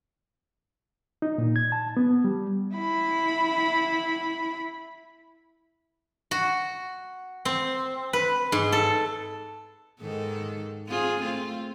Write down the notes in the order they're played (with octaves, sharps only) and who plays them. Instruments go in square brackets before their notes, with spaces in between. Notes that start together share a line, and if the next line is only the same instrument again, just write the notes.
[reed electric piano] D#4
A#2
G#6
A5
B3
G3
[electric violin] E4 B5
[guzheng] F#4
C4
B4
G#2
A4
[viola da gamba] G#2 D#3 A4
C4 F4 G#4
A3 C4 F4